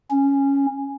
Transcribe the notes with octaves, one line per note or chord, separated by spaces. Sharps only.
C#4